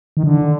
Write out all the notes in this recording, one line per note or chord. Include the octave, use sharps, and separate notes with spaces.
D#3
D3